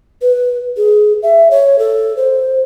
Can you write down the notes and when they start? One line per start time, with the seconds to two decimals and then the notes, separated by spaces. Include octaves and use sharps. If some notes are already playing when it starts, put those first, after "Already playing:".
0.22 B4
0.77 G#4
1.23 E5
1.51 C#5
1.79 A4
2.16 C5